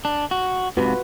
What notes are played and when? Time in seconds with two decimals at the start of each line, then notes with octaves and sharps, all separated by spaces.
0.05 D4
0.31 F#4
0.77 G#2 C3 F4 F#4 B4